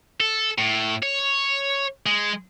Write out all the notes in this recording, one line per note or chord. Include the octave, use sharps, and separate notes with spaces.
A4
A2
C#5
G#3